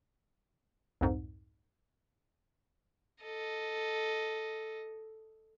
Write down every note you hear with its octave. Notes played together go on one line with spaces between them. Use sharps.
C2 F2 G#2
A4 D#5